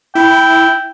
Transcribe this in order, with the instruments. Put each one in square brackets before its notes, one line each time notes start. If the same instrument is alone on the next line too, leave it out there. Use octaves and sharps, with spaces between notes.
[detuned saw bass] E4 [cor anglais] G5